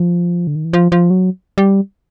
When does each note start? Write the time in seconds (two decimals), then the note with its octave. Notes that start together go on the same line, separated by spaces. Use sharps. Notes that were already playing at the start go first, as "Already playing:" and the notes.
Already playing: F3
0.47 D3
0.55 D#3
0.65 E3
0.73 F3
0.92 F3
1.10 F#3
1.58 G3